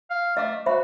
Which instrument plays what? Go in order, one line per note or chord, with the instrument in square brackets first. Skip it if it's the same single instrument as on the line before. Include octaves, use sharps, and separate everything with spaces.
[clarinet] F5
[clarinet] A3 [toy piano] D#5 D6
[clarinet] F#4 [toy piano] C5 E5 B5